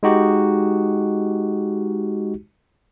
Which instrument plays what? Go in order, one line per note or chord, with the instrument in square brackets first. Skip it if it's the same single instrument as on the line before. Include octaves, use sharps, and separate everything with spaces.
[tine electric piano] G#3 D#4 F#4 G4